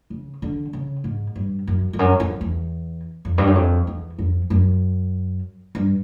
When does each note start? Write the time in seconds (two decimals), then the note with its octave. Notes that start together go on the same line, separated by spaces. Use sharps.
0.10 C#3
0.42 D3
0.73 C#3
1.04 G#2
1.36 G2
1.67 F#2
1.93 F2
1.99 F#2
2.20 F2
2.41 E2
3.25 F2
3.38 G2
3.47 F#2
3.55 F2
3.87 E2
4.19 F2
4.50 F#2
5.75 G2